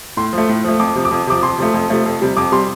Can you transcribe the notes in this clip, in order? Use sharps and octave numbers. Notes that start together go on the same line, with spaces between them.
A2 C6
F3 A3
A2
F3 A3
F2 D6
C3 F3
D6
F2
C3 F3 D6
F2 C6
C3 F3 A3
F2
C3 F3 A3
F2
C3 G3
F2 D6
C3 G3 C6